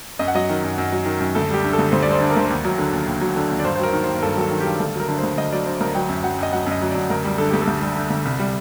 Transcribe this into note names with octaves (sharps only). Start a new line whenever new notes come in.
F#2 D#5
F#5
F#3 D#5
D#3
F#2
F#2
F#3
D#3
F#2
D2 A4
G3 G4
D3
A4
D2
D2 C5
D5
G3
C5
D3
A#4
D2 C5
A#4
D#2
F#3
D3
D#2
D#2
F#3
D3
D#2
D5
G2 C5
C5
F#3 A#4
D#3
G2 C5
A#4
G2 A4
A#4
F#3 A4
D#3
G2 G4
D2 A4
F#3 A#4
D3
D2 C5
D2 D#5
F#3 D5
D3 C5
D2 A#4
F#3 G5
F#2
F#3 F#5
F#2 D#5
F#3 F#5
F#2
D#5
F#3
F#2 D5
D2 A#4
G3
D3 A4
D2 G4
A4
D2
G3
D3
D2
C2
G3